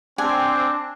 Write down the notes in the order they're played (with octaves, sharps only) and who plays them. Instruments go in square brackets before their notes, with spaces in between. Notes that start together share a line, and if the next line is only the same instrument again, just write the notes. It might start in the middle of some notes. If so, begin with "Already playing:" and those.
[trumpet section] C4 [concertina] D4 [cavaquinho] G#5